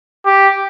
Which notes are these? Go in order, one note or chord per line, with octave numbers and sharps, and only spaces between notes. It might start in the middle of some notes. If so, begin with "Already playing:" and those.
G4